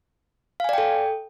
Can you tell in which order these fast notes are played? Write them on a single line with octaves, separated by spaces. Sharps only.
F5 G#5 D5 G5 A4